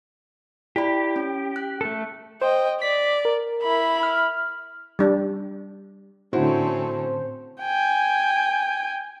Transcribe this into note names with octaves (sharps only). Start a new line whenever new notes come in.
E4 G4 D5 B5
C#4
F#6
A3 A4
C5 D#5 G5
D5 B6
A#4
E4 B5
F6
G3 D4
A2 D3 C4 C#4 E4 F#4 A4 C5
G5 G#5